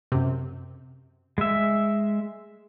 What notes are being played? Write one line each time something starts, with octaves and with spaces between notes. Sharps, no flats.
F#2 C3
G#3 E5